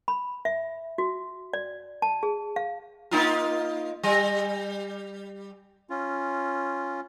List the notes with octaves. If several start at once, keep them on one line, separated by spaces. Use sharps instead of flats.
B5
E5
F#4
D5
A5
G#4
F5
A#3 D#4 F4
G3
C#4 F4